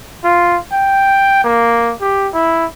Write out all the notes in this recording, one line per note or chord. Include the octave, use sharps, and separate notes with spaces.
F4
G5
A#3
G4
E4